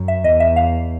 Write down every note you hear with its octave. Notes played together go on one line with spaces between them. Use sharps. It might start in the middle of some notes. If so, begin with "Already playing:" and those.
Already playing: F#2
E5
E2 D#5
E5
F5